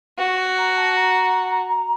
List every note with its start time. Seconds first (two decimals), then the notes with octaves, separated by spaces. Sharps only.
0.18 F#4 C#6
0.58 A#5
0.77 A5
0.96 A#5